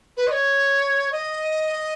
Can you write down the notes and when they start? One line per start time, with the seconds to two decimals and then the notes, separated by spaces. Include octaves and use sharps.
0.17 B4
0.27 D#5
0.31 C#5
1.11 D#5